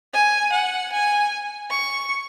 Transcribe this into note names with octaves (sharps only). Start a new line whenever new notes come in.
G#5
F#5
G#5
C#6